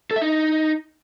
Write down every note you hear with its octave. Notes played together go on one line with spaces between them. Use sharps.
A4
E5
D#4